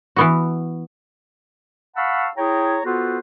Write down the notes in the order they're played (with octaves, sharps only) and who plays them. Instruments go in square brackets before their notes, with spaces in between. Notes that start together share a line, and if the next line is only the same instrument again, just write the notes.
[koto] E3 B3 F#4
[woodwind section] F5 F#5 A5 B5 C#6 E6
E4 G#4 C#5 G5 A#5
B3 F4 F#4 A4 B4 C5